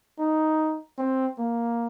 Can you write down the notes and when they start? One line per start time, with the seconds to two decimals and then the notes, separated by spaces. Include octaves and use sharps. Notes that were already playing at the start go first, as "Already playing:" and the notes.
0.19 D#4
0.98 C4
1.38 A#3